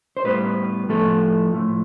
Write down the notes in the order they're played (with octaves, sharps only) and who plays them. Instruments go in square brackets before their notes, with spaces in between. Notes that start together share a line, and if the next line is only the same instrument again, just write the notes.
[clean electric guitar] C5
A2 G3 B3 B4
A2 F3 A3 A4
A2 F3 A3